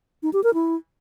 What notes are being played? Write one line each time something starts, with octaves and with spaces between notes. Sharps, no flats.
D#4
G4
A#4
E4